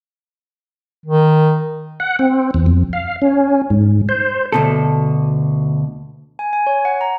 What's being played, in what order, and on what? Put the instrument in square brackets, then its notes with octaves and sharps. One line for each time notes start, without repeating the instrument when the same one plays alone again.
[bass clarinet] D#3
[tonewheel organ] F#5
C4
E2
F2
F5
C#4
G#2
C5
[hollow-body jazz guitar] D2 B2 A4
[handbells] G#5
G#5
C#5
F#5
A#5